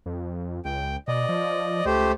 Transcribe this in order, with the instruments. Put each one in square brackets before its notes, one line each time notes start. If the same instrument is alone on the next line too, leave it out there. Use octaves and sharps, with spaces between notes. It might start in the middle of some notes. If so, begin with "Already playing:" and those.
[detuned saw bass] F2
[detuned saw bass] C#2 [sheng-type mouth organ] G5
[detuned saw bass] B2 [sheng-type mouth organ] D5 D#5
[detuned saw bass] F3
[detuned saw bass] C#2 [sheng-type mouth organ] A3 G4 C5